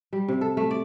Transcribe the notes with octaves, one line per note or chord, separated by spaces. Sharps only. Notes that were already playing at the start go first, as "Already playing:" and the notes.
G3
C3
A4
A3
D5